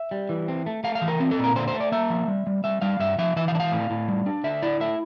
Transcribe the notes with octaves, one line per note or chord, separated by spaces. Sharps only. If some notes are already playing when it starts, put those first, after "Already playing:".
Already playing: E5
G3
E3
C4
A3
A3 F5
F5
E3
A#4
C4
A4
A#2
A#4
D3 C5
C5
A3
D5
A#3 E5
F3
G3
G3
G3 E5
G3 F5
G2 E5
F3 E5
E3 E5
F5
D4
F5
A2
A2
G3
D4
D3 E5
E4 D5
A3 E5